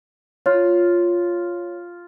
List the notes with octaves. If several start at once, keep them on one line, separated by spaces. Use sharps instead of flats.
F4 C#5